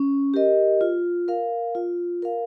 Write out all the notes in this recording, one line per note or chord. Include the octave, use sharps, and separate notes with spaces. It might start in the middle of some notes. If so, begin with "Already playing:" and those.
Already playing: C#4
G4 A#4 D#5
F4
A#4 F5
F4
A#4 F5